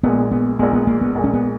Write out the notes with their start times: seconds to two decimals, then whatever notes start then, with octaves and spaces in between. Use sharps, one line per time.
0.03 A#1 A#2 G#3 B3
0.31 B3
0.59 A#1 A#2 G#3 B3
0.73 B3
0.87 A#3
1.01 B3
1.15 A#1 A#2 G#3
1.24 C#4
1.33 B3